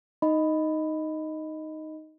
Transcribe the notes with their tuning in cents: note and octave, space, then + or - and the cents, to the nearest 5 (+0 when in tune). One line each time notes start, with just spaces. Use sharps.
D#4 +0 D#5 +0 B5 +10